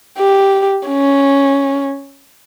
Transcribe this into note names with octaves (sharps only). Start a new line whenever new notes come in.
G4
C#4